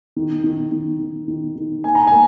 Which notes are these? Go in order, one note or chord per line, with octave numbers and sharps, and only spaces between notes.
D#3
D#3
D#3
D#3
D#3
D#3
A#3 G#5
A#5
A#3 G#5